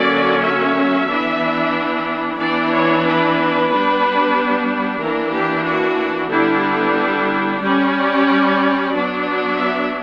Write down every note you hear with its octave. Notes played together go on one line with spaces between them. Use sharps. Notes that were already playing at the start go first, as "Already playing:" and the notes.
Already playing: D3 F#3 A#3 C#4 D5
E5
E3 B3 D4
E3 B3 D4 D5
C#5
B4
G3 B3 D4
E3 A#3 D4 A#4
G4
F#4
D3 G3 B3 D4 E4
E4
G3 C#4 D5
F#3 B3 D4
E5